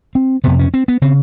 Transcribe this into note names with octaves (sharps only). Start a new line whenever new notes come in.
C4
F2 C3 B3
C#4
C4
B3
C#3 C4